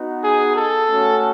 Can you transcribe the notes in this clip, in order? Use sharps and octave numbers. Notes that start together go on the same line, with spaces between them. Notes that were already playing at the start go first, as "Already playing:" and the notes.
Already playing: B3 D#4 F#4
G#4
A4
A3 C#4 F#4